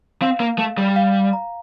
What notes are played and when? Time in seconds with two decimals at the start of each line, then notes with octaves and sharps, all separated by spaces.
0.21 C4 F5
0.40 A#3
0.58 A3 F5
0.78 G3
0.96 F5
1.33 A#5